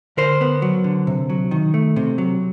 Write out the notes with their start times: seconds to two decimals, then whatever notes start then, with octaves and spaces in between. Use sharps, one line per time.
0.17 D3 A#4 C5
0.41 B3
0.62 F#3
0.84 D3
1.07 C3
1.30 F#3
1.51 D#3
1.74 A3
1.96 C3
2.18 F#3